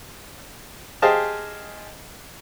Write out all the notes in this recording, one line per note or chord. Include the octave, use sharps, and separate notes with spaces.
G4 G#4 C5 D#5 F5 A5